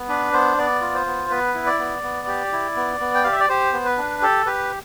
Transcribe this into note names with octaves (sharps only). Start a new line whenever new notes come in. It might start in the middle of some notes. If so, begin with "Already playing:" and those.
Already playing: B3
D4 B4
B3 C5
B3 D5
F4
C5
B3
B3 B4
E4
D5
B3
B3
G4
E4
B3
B3
G5
G4 F5
E5
D5
G4 C5
B3
B4
D4
G4 A4
G4 B4